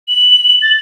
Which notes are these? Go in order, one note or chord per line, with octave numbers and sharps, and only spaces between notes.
F#7
A6